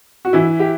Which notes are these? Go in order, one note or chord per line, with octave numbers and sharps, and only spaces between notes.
F#4
E3 E4
G4